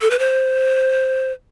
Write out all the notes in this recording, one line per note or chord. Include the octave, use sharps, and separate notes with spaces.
A4
B4
C5